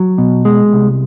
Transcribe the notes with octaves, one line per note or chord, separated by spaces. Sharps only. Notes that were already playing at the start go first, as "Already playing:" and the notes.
Already playing: F#3
B2
G#3
C2